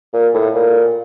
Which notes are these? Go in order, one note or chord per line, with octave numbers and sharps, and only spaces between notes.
A#2
A2
A#2